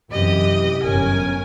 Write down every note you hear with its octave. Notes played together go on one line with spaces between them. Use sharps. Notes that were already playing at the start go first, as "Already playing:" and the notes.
F#2 C3 E3 G4 D#5
G1 F#2 C#4 A#4 G#5